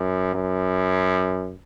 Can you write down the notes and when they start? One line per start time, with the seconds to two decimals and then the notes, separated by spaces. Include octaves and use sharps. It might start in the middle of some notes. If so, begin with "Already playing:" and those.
Already playing: F#2
0.34 F#2